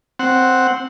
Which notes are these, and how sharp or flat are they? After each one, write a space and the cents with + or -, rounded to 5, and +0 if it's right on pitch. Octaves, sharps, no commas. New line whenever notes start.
C4 +0 F#5 +0